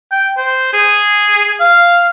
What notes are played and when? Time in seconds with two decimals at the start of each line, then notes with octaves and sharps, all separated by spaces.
0.12 G5
0.37 C5
0.73 G#4
1.60 F5